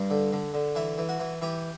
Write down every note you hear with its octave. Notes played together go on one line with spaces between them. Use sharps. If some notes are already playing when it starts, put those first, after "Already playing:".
Already playing: G2
D3
D3
D3
E3 E5
E3
F#4
E3
E3 G4